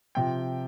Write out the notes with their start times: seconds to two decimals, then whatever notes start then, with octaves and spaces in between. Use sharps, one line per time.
0.15 C3 F3 G5